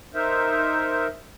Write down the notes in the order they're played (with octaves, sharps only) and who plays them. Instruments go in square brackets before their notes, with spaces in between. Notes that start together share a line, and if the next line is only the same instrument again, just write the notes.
[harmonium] D#4 A#4 C5 E5